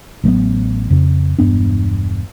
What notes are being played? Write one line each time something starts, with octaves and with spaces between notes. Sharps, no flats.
A1 F#3 G#3 B3
F2 C#3
E1 G2 B3 D4